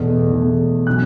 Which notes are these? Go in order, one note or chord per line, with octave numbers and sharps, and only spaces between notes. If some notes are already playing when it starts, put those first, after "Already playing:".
Already playing: E2 B2 A3
E2 B2 A3
B2 F#3 C#4 F#6